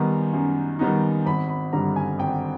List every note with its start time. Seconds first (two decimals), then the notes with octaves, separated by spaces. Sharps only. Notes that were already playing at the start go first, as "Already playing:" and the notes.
Already playing: F#2 D#3 G3 B3 D#4
0.33 F#2
0.79 D#3 G3 B3 D#4
1.26 G#1 B5
1.49 B5
1.73 G2 D3 G3 A#5
1.96 G#5
2.19 G#1 G5